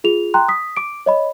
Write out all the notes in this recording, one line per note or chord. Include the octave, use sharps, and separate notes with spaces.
F4 G#4 F7
G5 A#5 C6 F#6
D#6 B6
D6 D7
C#5 D#5 B5